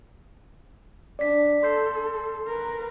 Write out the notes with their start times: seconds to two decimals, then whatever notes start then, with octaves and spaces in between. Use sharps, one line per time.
1.19 D4 D5 B6
1.63 A4 C6 G6 C7
2.47 A#4 B4